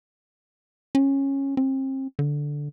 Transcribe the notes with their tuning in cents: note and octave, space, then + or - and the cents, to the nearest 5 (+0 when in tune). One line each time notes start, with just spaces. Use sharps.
C#4 -15
C4 +35
D3 -5